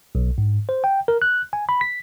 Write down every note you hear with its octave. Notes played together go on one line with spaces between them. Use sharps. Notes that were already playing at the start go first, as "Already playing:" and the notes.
B1
G#2
C5
G5
A#4
F#6
G#5
B5
B6